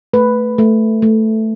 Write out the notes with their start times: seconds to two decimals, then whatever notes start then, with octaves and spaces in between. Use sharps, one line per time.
0.13 A3 B4
0.58 A3
1.02 A3